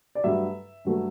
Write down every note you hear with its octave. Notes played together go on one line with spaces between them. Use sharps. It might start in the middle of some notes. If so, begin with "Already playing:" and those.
D5
G2 F#3 A3 E5
G2 F#3 A3